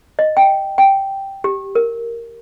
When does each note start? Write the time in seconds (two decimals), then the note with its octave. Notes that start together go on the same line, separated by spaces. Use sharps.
0.19 D#5
0.37 G5
0.78 G5
1.44 G4
1.75 A#4